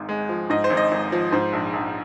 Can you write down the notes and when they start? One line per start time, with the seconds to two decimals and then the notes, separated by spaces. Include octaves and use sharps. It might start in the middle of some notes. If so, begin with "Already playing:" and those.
Already playing: G#1 G#2
0.09 G#3
0.29 F3
0.50 G#2 D#5
0.64 C5
0.70 G#1
0.77 D#5
0.91 G#1
1.12 F3
1.32 G#2 C5
1.53 A#1
1.73 A#1